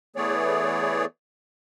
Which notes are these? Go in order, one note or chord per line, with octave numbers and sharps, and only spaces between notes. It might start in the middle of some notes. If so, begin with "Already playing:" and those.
E3 A3 B3 G#4 C#5 D5